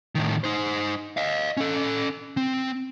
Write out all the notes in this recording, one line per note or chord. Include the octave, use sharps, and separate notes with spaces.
A2 D#3
D#4 C5
D#5 F5
C#4 A4
C4